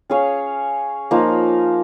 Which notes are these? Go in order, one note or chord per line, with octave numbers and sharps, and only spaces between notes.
C#4 G#4 C#5 F5
F3 A#3 D#4